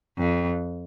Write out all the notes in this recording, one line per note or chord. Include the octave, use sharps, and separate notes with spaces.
F2